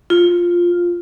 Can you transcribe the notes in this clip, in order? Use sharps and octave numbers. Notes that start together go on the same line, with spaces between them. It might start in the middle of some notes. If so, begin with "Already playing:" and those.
F4